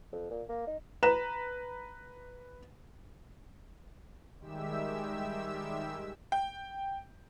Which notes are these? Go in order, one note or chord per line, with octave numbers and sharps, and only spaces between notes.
F2
A#2
A#3
D#4
B4 A#5 E7
D#3 G3 G#3 G4 E5 E6
G5